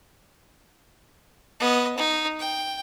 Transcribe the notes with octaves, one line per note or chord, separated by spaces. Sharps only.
B3 D#5
D#4
G5